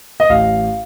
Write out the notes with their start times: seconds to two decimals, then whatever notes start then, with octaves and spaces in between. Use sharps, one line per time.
0.20 D#5
0.29 A1 F5